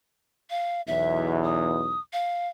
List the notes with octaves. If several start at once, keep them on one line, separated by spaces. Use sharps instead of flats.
F5
B1 E2 E5
D#6
F5